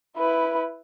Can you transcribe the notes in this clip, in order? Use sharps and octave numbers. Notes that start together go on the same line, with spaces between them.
E4 B4